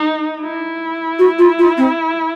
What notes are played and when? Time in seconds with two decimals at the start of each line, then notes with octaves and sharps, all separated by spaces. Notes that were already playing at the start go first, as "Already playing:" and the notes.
Already playing: D#4
0.42 E4
1.19 F#4
1.39 F4
1.59 F4
1.77 C4